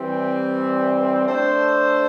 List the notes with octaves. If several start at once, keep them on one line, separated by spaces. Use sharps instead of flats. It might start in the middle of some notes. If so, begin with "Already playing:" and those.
Already playing: E3 G3 C4
A3 D4 A4 C5